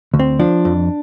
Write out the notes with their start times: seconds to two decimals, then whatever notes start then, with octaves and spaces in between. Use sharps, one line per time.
0.14 D2
0.19 C4
0.39 F3 D4
0.65 F2